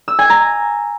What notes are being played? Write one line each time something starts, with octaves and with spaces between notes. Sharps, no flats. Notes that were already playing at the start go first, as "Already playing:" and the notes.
E6
G#5
A#5